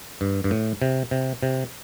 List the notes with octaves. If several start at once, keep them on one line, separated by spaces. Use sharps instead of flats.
G2
G2
A2
C3
C3
C3